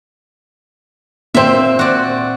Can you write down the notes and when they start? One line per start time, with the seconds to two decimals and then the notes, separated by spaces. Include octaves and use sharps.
1.34 A#2 C4 C5 E5
1.79 F#4 D5